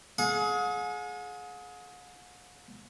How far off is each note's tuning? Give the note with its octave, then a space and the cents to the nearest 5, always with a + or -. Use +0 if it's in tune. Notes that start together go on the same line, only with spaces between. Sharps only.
G#4 +25 F#5 -45